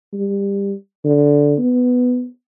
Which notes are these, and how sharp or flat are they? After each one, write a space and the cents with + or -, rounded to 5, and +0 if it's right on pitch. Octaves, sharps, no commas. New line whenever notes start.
G3 +25
D3 -10
B3 +10